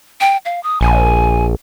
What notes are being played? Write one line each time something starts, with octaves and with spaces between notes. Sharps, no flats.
G5
F5
D#6
A#1 G#5